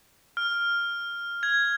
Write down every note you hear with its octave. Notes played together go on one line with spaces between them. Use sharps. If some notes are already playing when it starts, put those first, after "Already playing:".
F6
G#6